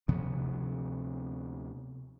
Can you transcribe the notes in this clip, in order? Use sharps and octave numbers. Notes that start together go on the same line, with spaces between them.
D2 C3 F3 B3